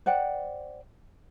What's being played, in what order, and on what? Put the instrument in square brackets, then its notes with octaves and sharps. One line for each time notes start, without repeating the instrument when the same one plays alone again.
[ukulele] C5 D5 F#5 G5